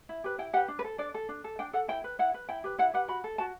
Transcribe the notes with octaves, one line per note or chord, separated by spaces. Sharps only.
E4
G4 B4
E4 G5
G4 B4 F#5
D4
B4
A4
D4 D5
A4
D4
A4
D4 G5
A4 F#5
E4 G5
B4
E4 F#5
B4
E4 G5
G4 B4
E4 F#5
G4 B4 F#5
F#4 B5
A4
F#4 A5